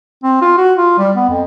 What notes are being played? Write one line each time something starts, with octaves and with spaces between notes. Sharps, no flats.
C4
F4
F#4
F4
G3
B3
F2